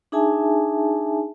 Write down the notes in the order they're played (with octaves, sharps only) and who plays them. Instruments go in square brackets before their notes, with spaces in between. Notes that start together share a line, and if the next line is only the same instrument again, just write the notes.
[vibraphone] D4 D#4 G#4 E5 G#5 A5